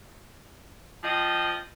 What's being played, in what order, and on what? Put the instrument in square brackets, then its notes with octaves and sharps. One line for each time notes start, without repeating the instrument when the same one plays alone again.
[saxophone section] F3 C4 D#5